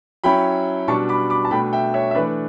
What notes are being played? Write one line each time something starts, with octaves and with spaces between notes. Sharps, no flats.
F#3 C#4 E4 G5 B5
B2 G3 D4 A5 C#6
B5 D6
B5 D6
A5
B2 A3 D4 G5 B5
E5 G5
C#5 E5
E5
E3 A3 D4 B4 D5